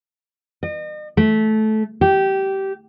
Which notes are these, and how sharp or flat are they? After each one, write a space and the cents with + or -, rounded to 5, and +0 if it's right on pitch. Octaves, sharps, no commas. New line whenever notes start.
D#5 -40
A3 -15
G4 -15